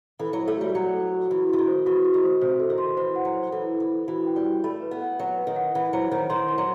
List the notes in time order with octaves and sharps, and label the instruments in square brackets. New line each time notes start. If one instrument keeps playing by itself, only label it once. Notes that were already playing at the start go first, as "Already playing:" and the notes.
[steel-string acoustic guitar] E3 [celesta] A4
[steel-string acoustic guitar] F#3
[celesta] C5
[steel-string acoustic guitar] A3
[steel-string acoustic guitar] G3 [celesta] F#4
[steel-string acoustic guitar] F#3 [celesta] F#4
[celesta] A4
F#4
[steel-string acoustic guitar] E3 [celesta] F#4
[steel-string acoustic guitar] E3 [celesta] F#4
[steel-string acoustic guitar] D#3
[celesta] C5
[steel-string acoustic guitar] E3 [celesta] F#4
[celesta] F#4
[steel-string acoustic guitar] D#3
[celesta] C5
[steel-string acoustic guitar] C3 [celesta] C5
[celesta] A4
[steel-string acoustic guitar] D#3
[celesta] C6
[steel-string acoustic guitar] E3 [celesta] C5
[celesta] F#5
[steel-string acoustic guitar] F#3
[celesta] C5
[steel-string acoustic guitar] E3 [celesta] A4
[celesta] A4
[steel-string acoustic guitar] E3
[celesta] A4
[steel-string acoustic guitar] E3 [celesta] F#4
[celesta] G5
[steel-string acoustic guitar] G3
[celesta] G5
[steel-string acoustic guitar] A3 [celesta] B5
[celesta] B4
[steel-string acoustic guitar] B3
[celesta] F#5
[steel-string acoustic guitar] F#3 [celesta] F#5
[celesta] B4
[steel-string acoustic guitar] D#3
[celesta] F#5
[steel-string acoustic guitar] E3 [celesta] F#5
[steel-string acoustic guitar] F#3 [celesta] C5
[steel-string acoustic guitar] D#3 [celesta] C5
[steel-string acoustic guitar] D#3 [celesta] C6
[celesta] C6
[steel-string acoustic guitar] F#3